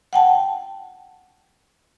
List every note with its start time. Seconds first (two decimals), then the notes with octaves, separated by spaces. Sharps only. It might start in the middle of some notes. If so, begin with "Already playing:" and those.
0.13 F#5 G5 A5